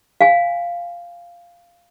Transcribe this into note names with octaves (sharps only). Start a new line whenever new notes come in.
F5 G#5